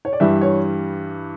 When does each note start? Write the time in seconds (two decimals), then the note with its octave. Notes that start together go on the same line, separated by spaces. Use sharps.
0.05 C#5
0.13 D5
0.20 G2 E3 G3 E5
0.41 C#5